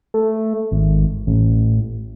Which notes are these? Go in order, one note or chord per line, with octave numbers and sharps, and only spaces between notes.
A3
G#1
A1